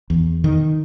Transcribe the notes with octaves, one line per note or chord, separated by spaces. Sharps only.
E2
D#3